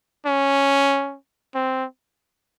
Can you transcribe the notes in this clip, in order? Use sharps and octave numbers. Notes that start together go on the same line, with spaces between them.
C#4
C4